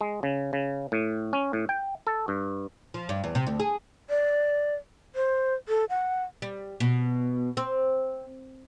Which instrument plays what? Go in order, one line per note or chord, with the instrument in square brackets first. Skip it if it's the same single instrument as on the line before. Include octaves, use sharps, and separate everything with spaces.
[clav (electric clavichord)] G#3
C#3
C#3
A2
C#4
A2
G5
A4
G2
[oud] F3
G2
E2
C3
D2
G#4
[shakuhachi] D5
C5
A4
F#5
[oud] G3
B2
C4